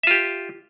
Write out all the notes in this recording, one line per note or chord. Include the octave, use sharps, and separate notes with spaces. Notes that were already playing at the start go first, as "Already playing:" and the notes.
F4 G4 E5